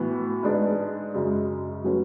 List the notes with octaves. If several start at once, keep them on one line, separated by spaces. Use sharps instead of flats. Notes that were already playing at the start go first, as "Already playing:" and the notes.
Already playing: A2 E3 B3 F#4
G#2 G#3 D4 G#4 B4
F#2 C#3 G#3
F#3 A3 C#4 F#4 B4